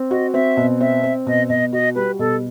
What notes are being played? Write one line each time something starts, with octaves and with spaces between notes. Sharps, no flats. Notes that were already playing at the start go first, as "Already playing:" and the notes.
Already playing: C4
F#4 D#5
C4 E5
B2
C4 E5
C4
B2 D#5
B2 D#5
F#4 D#5
G3 B4
B2 A4